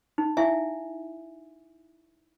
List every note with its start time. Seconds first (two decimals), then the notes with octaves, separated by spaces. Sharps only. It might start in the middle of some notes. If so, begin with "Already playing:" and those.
0.18 D#4
0.37 E4 E5 F5 G#5